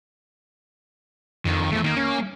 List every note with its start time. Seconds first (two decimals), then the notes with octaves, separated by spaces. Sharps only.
1.45 F2 D3 D#3
1.72 E2 F3 A3
1.84 D#3 A#3
1.97 C#4